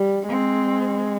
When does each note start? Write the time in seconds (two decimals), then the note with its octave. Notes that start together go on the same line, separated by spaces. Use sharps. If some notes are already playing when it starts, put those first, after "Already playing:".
Already playing: G3
0.29 G#3 C4